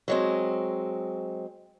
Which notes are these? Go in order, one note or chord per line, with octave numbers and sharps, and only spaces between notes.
F#3 G#3 C4